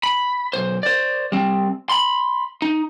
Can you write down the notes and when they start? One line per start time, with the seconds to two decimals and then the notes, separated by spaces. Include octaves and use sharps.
0.03 B5
0.53 B1 C5
0.83 C5 D5
1.32 G3 C4
1.89 B5 C6
2.62 D#4